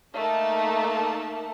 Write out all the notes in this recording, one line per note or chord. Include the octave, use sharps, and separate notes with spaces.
A3 A#3 D#4 A5